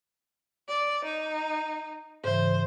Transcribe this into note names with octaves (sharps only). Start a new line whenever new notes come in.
D5
D#4
G#2 C#3 E3 C5